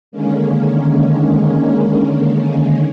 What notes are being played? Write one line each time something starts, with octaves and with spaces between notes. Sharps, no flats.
D3 D#3 G#3 A#3 C#4